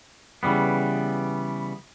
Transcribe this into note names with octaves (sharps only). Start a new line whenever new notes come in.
C#3 E3 G3 B3